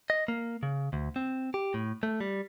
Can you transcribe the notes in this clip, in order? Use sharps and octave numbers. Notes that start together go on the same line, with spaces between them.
D#5
A#3
C#3
D2
C4
G4
A2
A3
G3